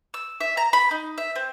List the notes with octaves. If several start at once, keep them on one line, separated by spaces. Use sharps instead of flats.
E6
E5
A#5
B5
D#4
E5
C4